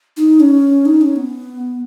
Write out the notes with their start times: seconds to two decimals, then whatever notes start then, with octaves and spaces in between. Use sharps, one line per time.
0.17 D#4
0.40 C#4
0.85 D#4
1.01 C#4
1.16 B3